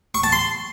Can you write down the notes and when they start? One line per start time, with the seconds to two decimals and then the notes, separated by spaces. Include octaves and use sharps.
0.15 C#6
0.24 A5
0.32 C6